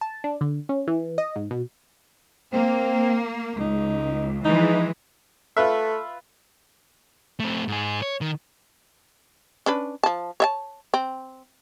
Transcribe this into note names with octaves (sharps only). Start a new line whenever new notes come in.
A5
D4
D3
C#4
E3
D#5
G#2
B2
A#3 C4
C#2 D#4
E3 F3 G#3 D#4
A3 F4 B4 E5
A3 C4
G#2 G#4
C#5
D#3
C#4 D4 B4
F3 A5
C#5 E5 A5
C4